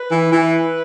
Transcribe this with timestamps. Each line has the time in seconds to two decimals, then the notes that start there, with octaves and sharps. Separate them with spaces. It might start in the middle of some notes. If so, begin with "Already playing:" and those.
Already playing: B4
0.10 E3
0.32 E3